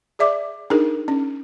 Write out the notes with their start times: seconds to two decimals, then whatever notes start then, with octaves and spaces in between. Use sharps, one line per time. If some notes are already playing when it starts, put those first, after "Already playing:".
0.19 G#4 D5 E5 D6
0.70 D4 D#4 G#4 A#4
1.08 C#4